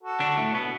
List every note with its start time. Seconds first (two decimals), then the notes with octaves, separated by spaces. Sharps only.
0.03 F#4 A4
0.20 D3 D4
0.37 A2 A3
0.54 B2 B3